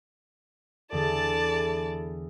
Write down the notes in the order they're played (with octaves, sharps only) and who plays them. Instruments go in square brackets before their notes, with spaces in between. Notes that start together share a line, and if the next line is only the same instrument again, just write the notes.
[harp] E2 D3 [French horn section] E4 G#4 A4 [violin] D5 A5